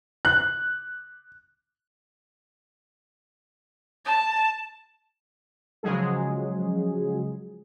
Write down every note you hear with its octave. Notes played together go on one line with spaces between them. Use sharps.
F#6
A5
C#3 F3 F#3 G#3 G#4